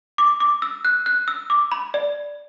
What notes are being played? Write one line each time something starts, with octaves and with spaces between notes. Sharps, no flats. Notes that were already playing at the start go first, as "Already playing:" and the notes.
D6
D6
E6
F#6
F#6
E6
D6
B5
D5